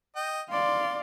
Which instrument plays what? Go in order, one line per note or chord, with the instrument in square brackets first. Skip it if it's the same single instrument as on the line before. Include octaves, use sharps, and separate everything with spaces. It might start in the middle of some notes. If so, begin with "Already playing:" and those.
[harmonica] D#5 G5
[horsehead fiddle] D5 F5 [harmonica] C6